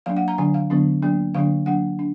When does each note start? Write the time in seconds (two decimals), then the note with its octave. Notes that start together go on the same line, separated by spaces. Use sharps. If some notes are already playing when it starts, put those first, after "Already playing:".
0.06 F#3 A#3 D4 F5
0.17 F#5
0.28 A#5
0.38 D3 F#3 D4 G#5
0.54 F5
0.70 D3 F#3 B3 D4
1.02 F#3 A#3 D4
1.35 D3 F#3 A#3 D4 F5
1.66 F#3 A#3 D4 F#5
1.99 D4